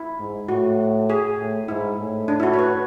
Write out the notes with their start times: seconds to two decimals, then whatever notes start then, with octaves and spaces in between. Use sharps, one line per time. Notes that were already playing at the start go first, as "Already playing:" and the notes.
Already playing: E4
0.19 G#2
0.48 A2 F#4
1.10 G#4
1.39 A2
1.68 G#2 E4
1.99 A2
2.28 D4
2.40 E4
2.43 F#4
2.54 C#5
2.59 B4